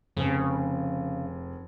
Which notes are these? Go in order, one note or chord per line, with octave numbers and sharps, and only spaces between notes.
F1 F2 C#3 G#4